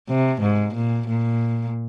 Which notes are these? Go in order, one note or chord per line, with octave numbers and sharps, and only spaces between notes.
C3
G#2
A#2
A#2